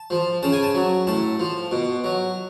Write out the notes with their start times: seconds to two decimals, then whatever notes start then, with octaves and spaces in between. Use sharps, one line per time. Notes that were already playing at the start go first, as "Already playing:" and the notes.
Already playing: A5
0.10 F3
0.43 C#3 A5
0.52 G#5
0.63 A5
0.75 F#3
1.07 A2 A5
1.40 F3
1.71 B2
2.04 F#3